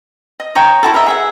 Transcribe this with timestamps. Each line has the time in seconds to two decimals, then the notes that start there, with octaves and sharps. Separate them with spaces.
0.40 D#5
0.55 C#5 G5 A#5 D#6
0.83 E4 F#4 A4
0.94 A#4 D#5 E5
1.06 G#4 E5 F#5